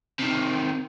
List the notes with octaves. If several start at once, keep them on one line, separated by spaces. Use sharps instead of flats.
C3 D#3